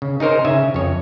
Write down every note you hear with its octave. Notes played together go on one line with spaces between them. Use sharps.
C#3
D#4 G#4 A#4 C5 C#5
C#3 E5 G#5
F2 C#5